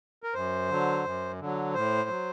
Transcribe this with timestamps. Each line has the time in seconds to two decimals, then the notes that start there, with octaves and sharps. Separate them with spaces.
0.23 A#4
0.34 F#2 C5
0.70 D3 F#3
1.05 F#2
1.40 D3 F#3
1.74 A2 C5
2.09 F#3